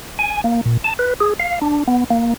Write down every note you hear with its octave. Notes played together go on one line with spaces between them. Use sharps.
G#5
A#3
A#2
A5
B4
G#4
F5
D4
B3
A#3